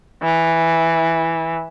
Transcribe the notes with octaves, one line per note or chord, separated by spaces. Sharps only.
E3